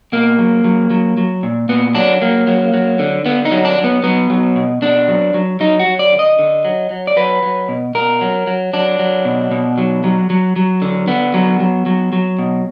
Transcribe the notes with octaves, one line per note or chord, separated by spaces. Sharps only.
B2 A#3
F#3
F#3
F#3
F#3
A#2
A#2 B3
F#3 D4
F#3 A#3
F#3
F#3
D3
D3 B3
D#4
F#3
D4
F#3
B3
F#3 B3
F#3
B2
B2 D4
F#3
F#3
F#3 D#4
F#4
F#3
D5
D3
D#5
D3
F#3
F#3
D5
F#3 B4
F#3
B2
B2 A#4
F#3
F#3
F#3 D4
F#3
B2
B2
F#3
F#3
F#3
F#3
D3
D3 B3
F#3
F#3
F#3
F#3
B2